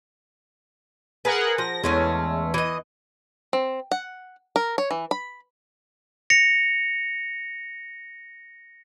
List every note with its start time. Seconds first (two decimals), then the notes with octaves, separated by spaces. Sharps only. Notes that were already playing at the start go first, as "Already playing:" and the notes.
1.25 G#4 A#4 B4 F#5
1.58 F3 A#6
1.84 E2 G#3 A3 C#4
2.54 E3 D#5
3.53 C4
3.92 F#5
4.56 A#4
4.78 C#5
4.91 E3
5.11 B5
6.30 A#6 C#7 F7